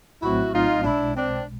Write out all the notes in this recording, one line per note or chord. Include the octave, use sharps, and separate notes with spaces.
A#1 A2 F#3 A3 C4 E4 F#4
D#4 F4
B1 B2 G#3 D4 E4
C4 D4